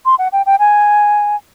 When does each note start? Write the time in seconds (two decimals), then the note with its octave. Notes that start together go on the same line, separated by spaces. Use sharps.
0.06 C6
0.19 F#5
0.32 G5
0.46 G5
0.59 G#5